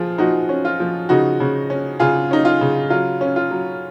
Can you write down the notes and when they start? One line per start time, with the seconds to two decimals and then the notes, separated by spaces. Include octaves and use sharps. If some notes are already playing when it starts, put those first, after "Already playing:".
Already playing: F3 F4 G#4
0.18 F3 D#4 F#4
0.49 C#4
0.65 F4
0.80 F3
1.09 C#3 D#4 F#4
1.40 C#3
1.70 C#4
2.00 C#3 F4 G#4
2.31 C#4 D#4
2.45 F4
2.61 C#3
2.90 F#3 F4
3.21 C#4
3.36 F4
3.51 F#3